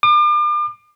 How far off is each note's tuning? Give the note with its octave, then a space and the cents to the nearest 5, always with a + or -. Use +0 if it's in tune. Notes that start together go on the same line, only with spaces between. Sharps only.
D6 +40